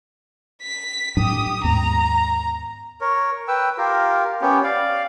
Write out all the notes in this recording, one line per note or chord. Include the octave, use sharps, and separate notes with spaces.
B6
A2 F#3 D4 G4 D#6
D#2 G#2 B3 A#5
A#4 C#5
B4 G5 E6
F4 G4 A#4
B3 C#4 G4
D5 F5